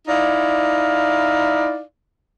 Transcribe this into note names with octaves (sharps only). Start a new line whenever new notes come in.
D#4 E4 D5 F5